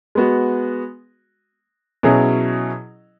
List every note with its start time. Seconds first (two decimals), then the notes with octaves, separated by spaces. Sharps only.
0.15 G#3 B3 F#4
2.03 B2 F#3 C#4 E4 G#4